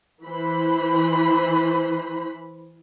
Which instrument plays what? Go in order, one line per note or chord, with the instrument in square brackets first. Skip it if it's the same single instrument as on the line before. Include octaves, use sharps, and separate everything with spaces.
[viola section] E3 C5 B5